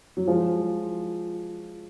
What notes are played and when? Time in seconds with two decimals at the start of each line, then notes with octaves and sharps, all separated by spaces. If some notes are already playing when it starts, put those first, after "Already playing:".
0.17 F#3
0.27 F3 G#3